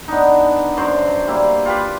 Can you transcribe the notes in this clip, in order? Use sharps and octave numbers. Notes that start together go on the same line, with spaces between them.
B3 D4 D#4
F#2 C5 D5
G3 A#3 E4
F4 G4 B4